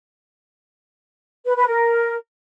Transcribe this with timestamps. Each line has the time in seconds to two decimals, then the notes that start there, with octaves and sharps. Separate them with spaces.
1.46 B4
1.57 B4
1.67 A#4